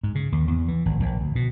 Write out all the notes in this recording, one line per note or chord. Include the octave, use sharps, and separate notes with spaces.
G#2
C#3
D#2
E2
E3
G#1
A#1
D2
B2